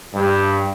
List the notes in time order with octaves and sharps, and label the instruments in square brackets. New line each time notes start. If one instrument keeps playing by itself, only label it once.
[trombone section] G2